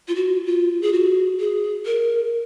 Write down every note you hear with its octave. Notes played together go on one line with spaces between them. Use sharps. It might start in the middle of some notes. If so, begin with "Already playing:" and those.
F4
F#4
F4
G#4
F#4
G#4
A#4